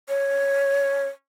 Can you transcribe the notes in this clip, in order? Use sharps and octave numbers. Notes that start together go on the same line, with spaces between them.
C#5